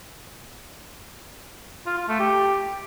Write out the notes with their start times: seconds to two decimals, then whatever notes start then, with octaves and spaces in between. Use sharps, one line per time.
1.87 F4
1.98 F4
2.09 A3
2.20 G4